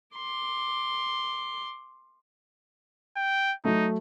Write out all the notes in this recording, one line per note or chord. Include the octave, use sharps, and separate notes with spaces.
C6 D6
G5
F#3 A3 D#4